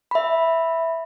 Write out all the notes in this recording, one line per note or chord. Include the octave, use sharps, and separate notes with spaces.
E5 B5